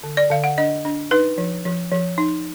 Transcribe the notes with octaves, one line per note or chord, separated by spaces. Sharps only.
D3
D5
D3 F5
F#5
D4 D#5
D4
D#4 B4
F3
F3
F3
D#4